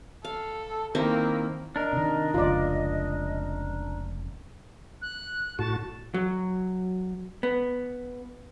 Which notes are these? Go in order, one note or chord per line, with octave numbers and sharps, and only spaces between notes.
A4 F5
D#3 A#3 C4 E4
D4 A#4 D#5
C3 D#3
F1 C#2 F4 D5
F#6
A2 F#4 A5
F#3
B3